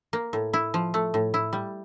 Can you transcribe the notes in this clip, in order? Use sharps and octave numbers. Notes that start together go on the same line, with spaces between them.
A#3
A2
E4
F3
A3
A2
E4
G3